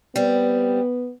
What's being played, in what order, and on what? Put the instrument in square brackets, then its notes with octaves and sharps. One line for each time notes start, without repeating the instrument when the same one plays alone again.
[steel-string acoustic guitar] G3 C4 [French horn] B3